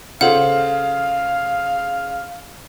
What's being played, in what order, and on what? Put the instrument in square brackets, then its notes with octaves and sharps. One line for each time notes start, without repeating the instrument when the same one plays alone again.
[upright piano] C#3 F4 C5 [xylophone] A4 F#5 [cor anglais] F5